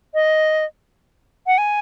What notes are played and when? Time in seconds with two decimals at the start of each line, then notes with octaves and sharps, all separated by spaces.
0.14 D#5
1.47 F#5
1.58 G#5